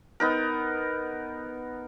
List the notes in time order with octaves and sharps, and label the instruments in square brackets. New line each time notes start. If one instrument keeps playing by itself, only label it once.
[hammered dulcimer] B3 D#4 A#4